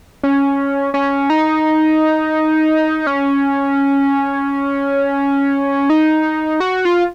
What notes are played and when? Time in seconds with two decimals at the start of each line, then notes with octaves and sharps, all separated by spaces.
0.23 C#4
0.94 C#4
1.30 D#4
3.07 C#4
5.90 D#4
6.60 F#4
6.85 F4